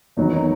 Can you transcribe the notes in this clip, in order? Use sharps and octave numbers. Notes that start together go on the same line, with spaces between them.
E2 D#3 F#3 D#4
D#4